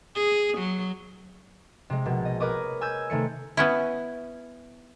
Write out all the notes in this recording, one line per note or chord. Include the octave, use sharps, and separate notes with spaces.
G#4
F#3
C3 G#3
A#1 B2
D#5
A#4 B4 C#5 D#5 D6 D#6
G#5 E6 G6 G#6
C3 D#3 A3 C#7
B3 C#4 E4